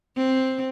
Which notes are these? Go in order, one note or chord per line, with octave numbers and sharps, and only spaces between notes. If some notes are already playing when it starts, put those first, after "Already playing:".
C4